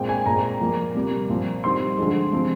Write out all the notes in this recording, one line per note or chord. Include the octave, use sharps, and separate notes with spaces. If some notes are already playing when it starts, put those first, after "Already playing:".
Already playing: A#2 G#3 C4 G5
G#5
A#2 G#3 C4 A#5
A#2 F3 A#3
C3 G3 A#3
A#2 F3 C4
D#3 G3 C4 C6
D3 F3 G#3
C3 F3 G#3 C4